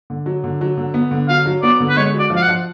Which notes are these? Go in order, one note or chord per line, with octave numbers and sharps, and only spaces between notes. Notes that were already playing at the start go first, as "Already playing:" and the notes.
D3
F#3
D3
F#3
D3
B3
D3
F#3 F5
F#3
B3 D5
D3
B4
G#3 C#5
F#4 D5
F3
F5
F#5
F3